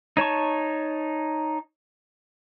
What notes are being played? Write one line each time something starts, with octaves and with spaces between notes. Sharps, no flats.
D#4 C#5 A5 C#6